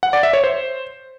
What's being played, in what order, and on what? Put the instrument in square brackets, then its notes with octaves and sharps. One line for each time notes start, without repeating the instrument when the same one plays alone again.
[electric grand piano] F#5
D5
E5
C#5
C5